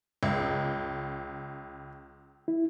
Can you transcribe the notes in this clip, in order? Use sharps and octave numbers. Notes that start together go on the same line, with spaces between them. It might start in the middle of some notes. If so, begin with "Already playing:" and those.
C#2
E4